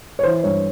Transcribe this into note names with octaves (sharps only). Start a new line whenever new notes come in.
C#5
E3 C5
G2 C#5